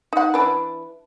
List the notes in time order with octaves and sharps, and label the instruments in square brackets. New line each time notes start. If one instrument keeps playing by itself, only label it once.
[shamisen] D#4 F#5
E3 D4 B4